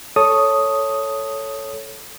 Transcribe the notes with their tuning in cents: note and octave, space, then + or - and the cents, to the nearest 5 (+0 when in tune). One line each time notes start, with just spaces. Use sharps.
A4 +0 C#5 +0 D#6 +0